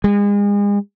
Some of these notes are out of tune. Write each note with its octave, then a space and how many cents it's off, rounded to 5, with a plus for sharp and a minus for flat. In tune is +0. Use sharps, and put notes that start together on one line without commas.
G#3 -35